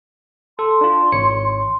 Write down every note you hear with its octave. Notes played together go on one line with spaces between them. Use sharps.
A4 C6
D4 F4
G#1 C#5 C#7
C6